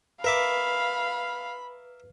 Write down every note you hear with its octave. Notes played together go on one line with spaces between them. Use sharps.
A#4 B4 E5 F5 B5 D6